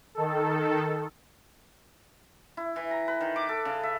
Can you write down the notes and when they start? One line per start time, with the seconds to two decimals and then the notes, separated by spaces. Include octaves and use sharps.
0.15 D#3 A4
2.57 E4
2.76 E3
2.91 A#5
3.08 B4
3.21 D#3
3.36 D6
3.49 A4
3.65 C#3
3.83 E5